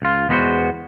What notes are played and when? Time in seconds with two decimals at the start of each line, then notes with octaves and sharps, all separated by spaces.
0.02 C#2 F4
0.29 E2 G#3 B3 D#4 F#4 C5